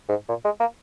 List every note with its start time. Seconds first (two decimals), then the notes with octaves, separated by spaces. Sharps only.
0.09 G#2
0.29 A#2
0.45 G#3
0.60 A#3